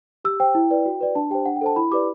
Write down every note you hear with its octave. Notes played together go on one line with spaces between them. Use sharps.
G4 E6
C5 G5
E4
B4 D5
F#4
B4 D5
D4 A5
G4 C5 G5
D4 F#5
G5
A4 C5 A5
E4 B5
G4 B4 D5 D6